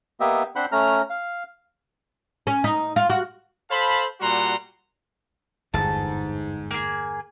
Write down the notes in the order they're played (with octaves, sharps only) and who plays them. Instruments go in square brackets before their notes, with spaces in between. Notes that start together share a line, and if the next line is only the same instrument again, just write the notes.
[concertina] A#3 B3 G4 D#5 E5
C4 D4 C5 F#5 B5 C6
A3 C#4 A#5 F6
F5
[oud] C#4
D#4
F4
F#4
[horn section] A4 C5 F5 A5 B5
A#2 G3 F#4 F#5 A#5 C6
[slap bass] G1 E2 [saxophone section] G#2 [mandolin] A5
[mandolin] A#3 G#4